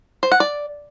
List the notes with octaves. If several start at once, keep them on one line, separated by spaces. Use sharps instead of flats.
C5
F#5
D5